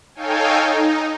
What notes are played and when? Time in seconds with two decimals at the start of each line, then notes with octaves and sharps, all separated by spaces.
0.15 D#4 A4 C#5 F5 G5 G#5
0.62 D#4